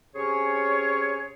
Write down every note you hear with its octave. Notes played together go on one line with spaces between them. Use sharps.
C3 C#4 G#4 C#5